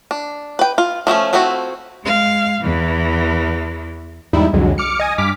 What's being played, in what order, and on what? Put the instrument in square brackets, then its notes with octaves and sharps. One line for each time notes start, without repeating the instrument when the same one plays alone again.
[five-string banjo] D4
B4 G5
F4
F3 A3 C4 C#4
F3 A3 C4 E4 F#4
[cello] G#3 F5
E2 E3
[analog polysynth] E2 G#2 G3 D#4 E4
C2 F2 D3 F#3 G#3
D6 F6 C#7
D#5 G#5 D#6
G2 D6 F6 B6